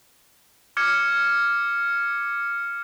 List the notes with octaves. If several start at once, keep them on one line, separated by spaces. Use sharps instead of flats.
D6 F6 G#6 C#7